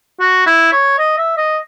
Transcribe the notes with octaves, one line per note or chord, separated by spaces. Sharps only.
F#4
E4
C#5
D#5
E5
D#5